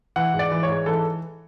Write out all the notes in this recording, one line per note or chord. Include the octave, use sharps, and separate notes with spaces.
E3 F#5
G#2
D5
E3
C#5
G#2
E3 A4